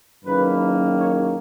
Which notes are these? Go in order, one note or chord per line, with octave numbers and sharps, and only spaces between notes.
F#1 F#2 D#3 A#3 B4
C#5